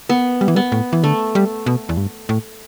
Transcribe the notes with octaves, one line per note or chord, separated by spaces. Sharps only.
B3
G3
E3
G3 B3
A2
E3
D3 A3
G3
B2
E2
G2
A2